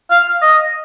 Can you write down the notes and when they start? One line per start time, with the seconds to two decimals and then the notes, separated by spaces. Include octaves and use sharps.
0.11 F5
0.42 D#5